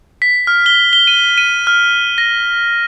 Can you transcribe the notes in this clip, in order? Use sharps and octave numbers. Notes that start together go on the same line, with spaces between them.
B6
F6
G7
G7
D#7
D#7
F6
A#6